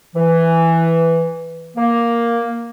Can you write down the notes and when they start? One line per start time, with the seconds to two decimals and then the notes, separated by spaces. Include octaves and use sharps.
0.16 E3
1.77 A#3